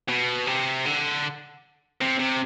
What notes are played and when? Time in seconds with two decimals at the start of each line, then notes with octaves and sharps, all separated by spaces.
0.09 B2
0.47 C3
0.85 D3
2.01 C3
2.20 C3